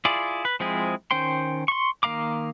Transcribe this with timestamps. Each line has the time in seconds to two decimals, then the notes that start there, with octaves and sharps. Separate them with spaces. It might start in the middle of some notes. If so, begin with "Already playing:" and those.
0.05 E4 F4 G#4 D5
0.45 B4
0.60 F3 G#3 C4 E4 G#4
1.11 D#3 C#4 C5 G5 C6
1.68 C6 C#6
2.03 D#3 A#3 F5 A#5 D6